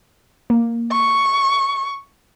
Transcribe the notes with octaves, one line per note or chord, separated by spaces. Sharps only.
A#3
C#6